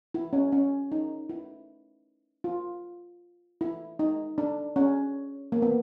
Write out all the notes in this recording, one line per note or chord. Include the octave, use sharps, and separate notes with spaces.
E4
C#4
C#4
D#4
E4
F4
E4
D#4
D4
C#4
A#3
B3